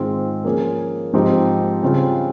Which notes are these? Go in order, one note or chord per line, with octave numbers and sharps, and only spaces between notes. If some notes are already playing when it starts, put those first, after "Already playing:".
Already playing: G#2 D#3 G#3 C4 F4
F3 A#3 C#4 G#4
G#2 F3 C4 D#4 G4
C#3 G3 C4 F4